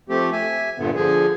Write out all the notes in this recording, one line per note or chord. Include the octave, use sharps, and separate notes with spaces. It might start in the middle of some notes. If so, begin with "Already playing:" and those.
F3 A3 C4 G4
E5 G#5
G2 A#2 D3 B3
D3 F3 G#4